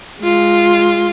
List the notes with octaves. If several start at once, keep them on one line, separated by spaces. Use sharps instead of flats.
G#3 F4